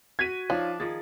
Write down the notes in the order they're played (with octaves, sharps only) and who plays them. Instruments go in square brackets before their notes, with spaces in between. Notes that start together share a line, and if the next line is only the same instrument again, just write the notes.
[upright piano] F#4 [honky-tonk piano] G#6 B6 D#7
[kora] F3 [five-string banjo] D4 [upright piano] D#4 F4 C#5
[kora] D#3 F3 G#4 [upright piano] A6